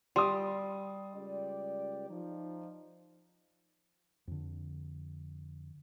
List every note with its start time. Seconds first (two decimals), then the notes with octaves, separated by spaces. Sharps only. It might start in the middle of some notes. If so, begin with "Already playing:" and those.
0.16 G3 C6 D#6
1.14 C#2 G4 D5
2.09 F3 D#4
4.27 F2 D3